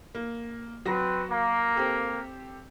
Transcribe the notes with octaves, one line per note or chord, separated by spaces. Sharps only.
A#3
F#3 C4 F#4 B4 A#6
A#3
C4 G4 A4